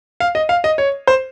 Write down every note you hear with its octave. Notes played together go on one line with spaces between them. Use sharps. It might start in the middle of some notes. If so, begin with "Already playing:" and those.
F5
D#5
F5
D#5
C#5
C5